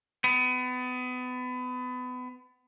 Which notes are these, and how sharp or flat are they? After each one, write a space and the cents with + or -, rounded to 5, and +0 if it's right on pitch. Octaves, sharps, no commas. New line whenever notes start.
B3 +30